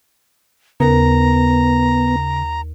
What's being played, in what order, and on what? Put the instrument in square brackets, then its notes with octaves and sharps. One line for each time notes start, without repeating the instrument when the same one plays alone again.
[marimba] D#2 A#4 [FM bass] C#3 [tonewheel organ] B3 [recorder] A#5